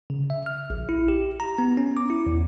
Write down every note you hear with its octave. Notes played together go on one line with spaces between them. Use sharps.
C#3
E5
F6
A#1
E4
G4
A#5
B3
C#4
D6
E4
E2